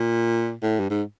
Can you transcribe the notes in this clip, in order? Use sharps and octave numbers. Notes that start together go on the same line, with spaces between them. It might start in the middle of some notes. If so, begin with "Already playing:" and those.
Already playing: A#2
A2
G2
G#2